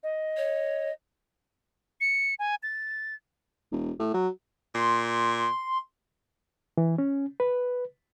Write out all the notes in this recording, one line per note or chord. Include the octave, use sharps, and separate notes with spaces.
D#5
C#5
C#7
G#5
A6
E1
A2
F#3
A#2 C6
E3
C#4
B4